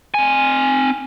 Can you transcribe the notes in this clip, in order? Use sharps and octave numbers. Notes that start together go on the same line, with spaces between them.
C4 G#5